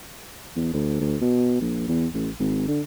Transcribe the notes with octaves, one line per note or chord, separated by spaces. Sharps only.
E2
D2
D2
B2
A#1
E2
A1
G#1
D3